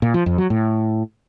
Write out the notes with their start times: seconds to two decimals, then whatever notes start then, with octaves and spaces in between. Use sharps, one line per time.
0.02 A#2
0.14 F3
0.26 F2
0.38 F#3
0.50 A2